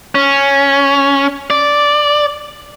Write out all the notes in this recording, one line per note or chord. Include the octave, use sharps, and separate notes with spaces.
C#4
D5